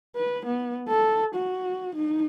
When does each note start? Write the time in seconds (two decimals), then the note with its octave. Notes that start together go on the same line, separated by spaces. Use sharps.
0.17 B4
0.46 B3
0.89 A4
1.35 F#4
1.95 D#4